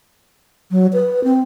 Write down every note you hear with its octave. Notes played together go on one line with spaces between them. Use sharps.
F#3
B4
C4